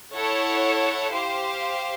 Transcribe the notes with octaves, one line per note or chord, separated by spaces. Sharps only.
E4 A4 C#5 F#5
G4 C5 F5